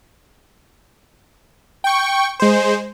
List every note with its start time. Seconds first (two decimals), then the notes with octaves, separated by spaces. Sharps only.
1.84 G5 C#6
2.40 G#3 C5